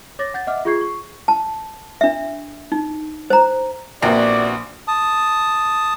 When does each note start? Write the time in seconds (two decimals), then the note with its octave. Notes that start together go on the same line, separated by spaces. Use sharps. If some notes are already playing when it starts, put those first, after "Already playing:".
0.19 C#5 D6 A6 A#6
0.34 F#5 G6 A6
0.47 D#5 E5 F#5 D6 F6
0.65 F4 G#4 C#6 G6 G#6 C7
0.81 C#6
1.28 A5
2.01 D4 E5
2.72 D#4
3.30 C5 A#5
4.02 A#1 C3 E3 A#3 B3 F#4 D5
4.88 A5 D#6